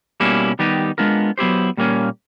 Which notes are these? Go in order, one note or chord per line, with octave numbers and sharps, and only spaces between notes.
B2 G3 A#3 C#4 E4
D#3 G3 B3 D#4 G4
G#3 B3 D4 F4 A#4
F#3 B3 E4 G4 C5
A#2 G3 A#3 C#4